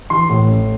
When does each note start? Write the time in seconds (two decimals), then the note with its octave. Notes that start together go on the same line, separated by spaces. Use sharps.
0.10 E3 C6
0.29 A2
0.48 A1